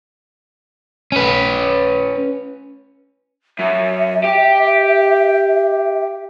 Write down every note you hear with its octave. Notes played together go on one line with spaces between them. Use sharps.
C#4 B4
F#2 E5
G4